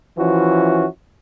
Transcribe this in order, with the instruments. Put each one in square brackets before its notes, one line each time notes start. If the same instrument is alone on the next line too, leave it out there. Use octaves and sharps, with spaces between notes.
[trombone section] E3 F3 C#4 E4 F#4